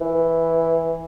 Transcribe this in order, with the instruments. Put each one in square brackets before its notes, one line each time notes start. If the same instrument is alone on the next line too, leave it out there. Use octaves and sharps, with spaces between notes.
[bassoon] E3